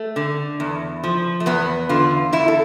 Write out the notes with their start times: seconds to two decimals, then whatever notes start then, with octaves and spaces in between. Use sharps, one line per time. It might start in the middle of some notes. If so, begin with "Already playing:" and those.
Already playing: A3
0.16 D3
0.60 E2
1.04 F3
1.40 A3
1.46 E2 B3
1.89 D3 F4
2.33 E2 E4
2.48 A4